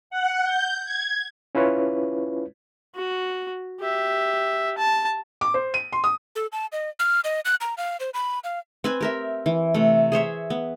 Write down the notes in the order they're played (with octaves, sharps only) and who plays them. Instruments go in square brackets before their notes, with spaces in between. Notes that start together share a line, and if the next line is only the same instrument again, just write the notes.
[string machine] F#5
G6
G#6
[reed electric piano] C#4 E4 F4 B4 C#5
[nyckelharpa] F#4
G4 E5
A5
[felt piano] D6
C5
D#7
C6
D#6
[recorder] A4
A5
D#5
F6
D#5
F#6
A#5
F5
C5
B5
F5
[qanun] C4 B4 G#5
G4 A#4 E5
E3
C3 A3
G#4 C5 C#5 E5
B3